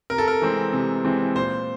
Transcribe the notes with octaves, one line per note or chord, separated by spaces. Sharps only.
C3 A#4
A4
A#4
E3 G#3 C4
C3
E3 G#3 C4
A#2 C5